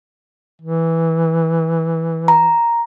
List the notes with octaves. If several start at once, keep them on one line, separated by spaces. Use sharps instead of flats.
E3
A#5